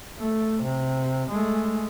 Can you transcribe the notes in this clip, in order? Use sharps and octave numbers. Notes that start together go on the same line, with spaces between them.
A3
C3
G#3 A3